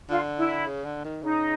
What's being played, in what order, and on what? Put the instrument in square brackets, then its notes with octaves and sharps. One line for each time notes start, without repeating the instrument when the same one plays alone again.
[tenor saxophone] D3 [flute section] F4
[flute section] E4
[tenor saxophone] C#3
D3
D#3
[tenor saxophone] C#3 [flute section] D#4